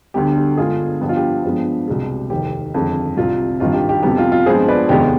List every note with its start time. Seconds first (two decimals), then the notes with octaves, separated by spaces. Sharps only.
0.14 D2 D3 G3 B3 G4
0.36 G4
0.57 G2 D3 G#3 B3 F4 G#4
1.01 G2 F3 B3 G4
1.09 F4
1.16 G4
1.44 G2 F3 G#3 B3
1.88 C2 B2 G#3
2.30 F1 D#2 D#3 G4
2.74 G1 F2 D#3 G#3
3.16 C2 C3 G3 F4
3.60 G#1 G2 D#3 G3 F4
3.74 G4
3.89 G4
4.03 F2 C3 G3 B3 G4
4.18 F4
4.32 F4
4.46 G2 F3 G#3 B3 G#4 C5
4.68 B4 D5
4.89 F1 D#2 D#3 G#3 B3 G4